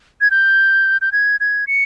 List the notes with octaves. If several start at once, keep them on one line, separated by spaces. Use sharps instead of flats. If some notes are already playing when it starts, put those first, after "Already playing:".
G#6
G6
G6
G#6
G#6
C#7